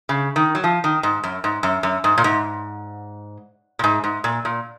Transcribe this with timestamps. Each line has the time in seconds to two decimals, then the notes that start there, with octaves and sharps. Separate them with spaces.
0.09 C#3
0.36 D#3
0.55 F#3
0.64 F3
0.84 D#3
1.03 G#2
1.24 F#2
1.44 G#2
1.63 F#2
1.83 F#2
2.04 G#2
2.18 A#2
2.24 G#2
3.79 A#2
3.84 G#2
4.04 G#2
4.24 A#2
4.45 A#2